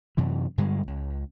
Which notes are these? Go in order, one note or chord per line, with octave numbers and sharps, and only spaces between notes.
F#2 C3 E3
G2 D3 G3 G#3
C#2